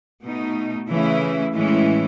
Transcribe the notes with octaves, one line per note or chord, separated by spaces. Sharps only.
B2 A3 D#4
C#3 E3 A3 C#4 E4
A2 E3 G#3 C#4 E4